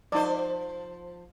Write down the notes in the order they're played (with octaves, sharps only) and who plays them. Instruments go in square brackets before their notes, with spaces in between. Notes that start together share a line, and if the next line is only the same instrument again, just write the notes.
[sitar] F3 C5 [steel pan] D#4 D5